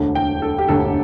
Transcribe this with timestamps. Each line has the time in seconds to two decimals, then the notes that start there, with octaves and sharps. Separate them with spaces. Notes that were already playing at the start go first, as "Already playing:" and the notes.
Already playing: E1 D2 D3
0.15 G5
0.42 A4
0.59 G4
0.68 E1 D2 D3 A4